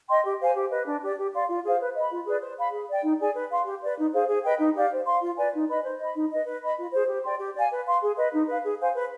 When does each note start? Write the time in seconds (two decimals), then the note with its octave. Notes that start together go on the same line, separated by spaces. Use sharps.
0.09 D#5 G5 C6
0.24 G4
0.39 C5 F5 G#5
0.54 G4
0.70 B4 D#5
0.86 D4
1.02 G4 D5
1.17 G4
1.33 D5 F5 C6
1.48 F4
1.64 G#4 C5 F5
1.79 B4
1.95 D#5 B5
2.11 F4
2.26 G#4 B4 D5
2.41 C5
2.57 F5 B5
2.72 G#4
2.88 D5 G5
3.04 D#4
3.20 G#4 D5 G#5
3.35 B4
3.50 F5 C6
3.65 G4
3.81 B4 D5
3.97 D#4
4.13 G#4 C5 F5
4.28 G#4
4.44 B4 D#5 G5
4.59 D#4
4.75 G4 D5 F5
4.90 C5
5.06 F5 C6
5.22 F4
5.37 B4 D5 G#5
5.53 D#4
5.68 B4 D#5 B5
5.84 C5
6.00 D#5 B5
6.15 D#4
6.31 B4 D#5
6.46 B4
6.61 D#5 B5
6.78 F4
6.93 G#4 C5
7.08 G4
7.24 D5 G5 C6
7.39 G4
7.55 D5 F5 G#5
7.71 B4
7.86 F5 C6
8.01 G#4
8.17 B4 D#5
8.33 D#4
8.48 B4 F5
8.64 G#4
8.80 C5 F5 G#5
8.95 B4